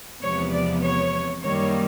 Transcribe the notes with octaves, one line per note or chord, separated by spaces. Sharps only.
E2 C3 F3 G#3 B3 C#5
D5
C#5
F#2 D#3 G3 A#3 C#5